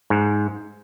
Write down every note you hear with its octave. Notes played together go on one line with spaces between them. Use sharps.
G#2